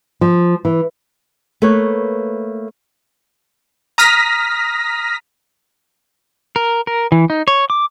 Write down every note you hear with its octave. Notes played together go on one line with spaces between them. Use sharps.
F3
E3
A3 A#3 B4 C#5
A#5 D#6 F6 A#6 B6
A#4
A#4
E3
D#4
C#5
D6